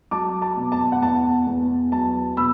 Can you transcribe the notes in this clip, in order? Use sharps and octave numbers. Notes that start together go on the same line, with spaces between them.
F#3 A5 D6
A5 D6
B2
A5
F#5
E2 A5
E2
F#3 A5
B2 B5 E6